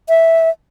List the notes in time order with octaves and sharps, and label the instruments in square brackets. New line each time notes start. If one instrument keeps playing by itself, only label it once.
[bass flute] E5